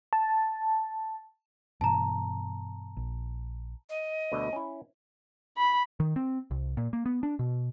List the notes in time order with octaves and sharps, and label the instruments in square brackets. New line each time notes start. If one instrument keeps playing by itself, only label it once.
[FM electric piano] A5
[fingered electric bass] G2 B2 E3 [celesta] A5 A#5
[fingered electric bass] A#1
[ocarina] D#5
[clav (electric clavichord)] D2 B2 D3
C#4 E4
[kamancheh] B5
[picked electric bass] D#3
C4
C2
A#2
A#3
B3
D4
B2